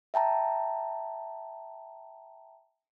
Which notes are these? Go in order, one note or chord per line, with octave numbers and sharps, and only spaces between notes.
E5 G5 A5 A#5